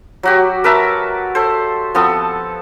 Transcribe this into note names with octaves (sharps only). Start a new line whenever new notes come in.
F#3 F#4 G4
A#4 B4 E5 A5
A4 C5
F3 B3 C4 A4